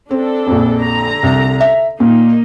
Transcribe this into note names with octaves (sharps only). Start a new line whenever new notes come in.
C4 D4 A4
A#1 F2
D3 A#5
C2
E5
A#2 A#3 D#4